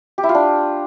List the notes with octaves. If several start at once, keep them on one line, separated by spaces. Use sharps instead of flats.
G4
E4
F4
D4